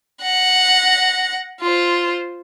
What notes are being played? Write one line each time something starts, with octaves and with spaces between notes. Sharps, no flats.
F#5 A#6
F4 C5